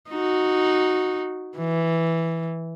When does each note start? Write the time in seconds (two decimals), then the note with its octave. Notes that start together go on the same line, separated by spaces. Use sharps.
0.10 D#4 F#4
1.57 E3